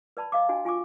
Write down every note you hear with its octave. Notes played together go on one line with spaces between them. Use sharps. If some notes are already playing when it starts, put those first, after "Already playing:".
B4 D5 A5 B5
D#5 F5 D6
D4 F#4 D#5 G#5
F4 G#5 C#6 D6